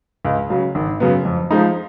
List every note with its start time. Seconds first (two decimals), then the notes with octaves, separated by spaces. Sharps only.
0.25 C#2
0.50 C#3 F#3
0.75 G#1
1.00 F#2 C#3 F#3 B3
1.25 F2
1.51 F3 G#3 D#4